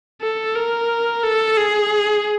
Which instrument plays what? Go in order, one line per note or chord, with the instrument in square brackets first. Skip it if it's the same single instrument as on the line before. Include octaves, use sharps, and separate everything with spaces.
[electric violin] A4
A#4
A4
G#4